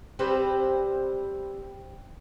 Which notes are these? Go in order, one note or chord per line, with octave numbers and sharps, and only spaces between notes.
G3 C4 B4 C5